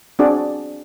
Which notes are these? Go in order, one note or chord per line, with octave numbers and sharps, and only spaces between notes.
C4 D4 F#4 G#4 D5